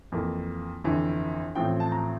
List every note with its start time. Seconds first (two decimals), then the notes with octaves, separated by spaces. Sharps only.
0.12 F2 E3 A#3
0.84 G1 F2 E3
1.55 A1 A2 F3 C4 G5
1.80 A5
1.92 A#5